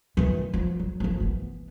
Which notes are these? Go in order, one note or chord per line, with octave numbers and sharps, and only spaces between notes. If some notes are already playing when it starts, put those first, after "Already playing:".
D#3 E3
F3
F#3
F3 A#3
E3 B3